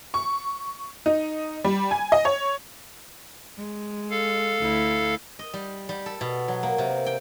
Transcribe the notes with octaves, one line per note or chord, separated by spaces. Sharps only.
C#6
D#4
G3
G#5
D#5
C#5
G#3
A4 F5
D2 E4
D#5
G3
G3
A4
B2
F#3
A#3
C3
G5